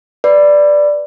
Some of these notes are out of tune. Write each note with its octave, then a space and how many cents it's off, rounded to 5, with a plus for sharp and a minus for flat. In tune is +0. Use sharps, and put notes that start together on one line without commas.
B4 +0 D5 +0